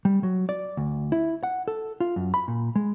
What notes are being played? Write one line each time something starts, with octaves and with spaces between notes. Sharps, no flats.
G3
F#3
D5
D2
E4
F#5
A4
F4
F#2
B5
A#2
G#3